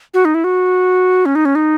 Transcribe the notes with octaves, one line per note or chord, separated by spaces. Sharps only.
F#4
D#4
E4
F#4
C#4
D#4
C#4
D#4